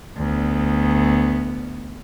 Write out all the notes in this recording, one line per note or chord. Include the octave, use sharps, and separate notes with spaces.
D2 B3